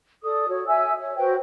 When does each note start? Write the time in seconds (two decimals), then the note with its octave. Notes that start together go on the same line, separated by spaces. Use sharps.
0.23 A4 D5 D#6
0.49 F#4 C#5
0.67 E5 G#5 E6
1.00 C#5
1.17 F#4 B4 C5 G5